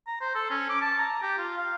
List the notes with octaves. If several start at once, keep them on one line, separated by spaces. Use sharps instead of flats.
A#5
C5
A4
C#4
D6
A5
A#5
G4
F4
F5